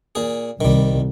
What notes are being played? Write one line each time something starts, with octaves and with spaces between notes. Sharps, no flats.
A#2 G#4
C2 D#3 G3